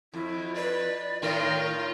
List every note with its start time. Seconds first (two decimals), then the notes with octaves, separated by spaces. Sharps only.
0.14 F2 E4
0.55 B4 D5
1.22 A2 D#3 F4 A#4